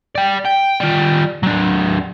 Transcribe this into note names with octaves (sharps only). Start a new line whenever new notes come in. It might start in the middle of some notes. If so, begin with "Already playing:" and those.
D5 G5
G5
G3 F4
F#3 D4